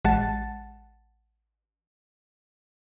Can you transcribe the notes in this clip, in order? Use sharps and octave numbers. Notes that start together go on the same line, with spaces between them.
A1 G#3 F#5 A5 A6